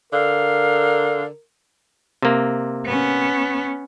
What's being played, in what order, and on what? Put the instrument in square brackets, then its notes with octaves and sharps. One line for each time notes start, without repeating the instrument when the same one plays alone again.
[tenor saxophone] D3 [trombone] A#4 [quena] F5
[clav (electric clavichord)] C3 A#3
[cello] B3 C#4